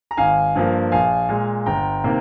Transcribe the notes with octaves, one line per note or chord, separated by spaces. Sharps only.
A#5
G#1 F5 G#5
G2 F3 A#3
A#1 F5 G#5
A#2 G#3
G1 G5 A#5
C3 D#3 A#3